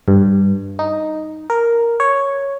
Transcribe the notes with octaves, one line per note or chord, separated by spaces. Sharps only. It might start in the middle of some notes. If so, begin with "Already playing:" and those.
G2
D#4
A#4
C#5